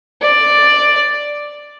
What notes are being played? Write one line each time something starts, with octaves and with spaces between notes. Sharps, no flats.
D5